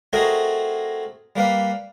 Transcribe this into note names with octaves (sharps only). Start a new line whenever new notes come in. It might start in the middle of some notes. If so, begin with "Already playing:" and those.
A3 C4 F#4 G#4 A#4 D#5
G3 A#3 B4 F5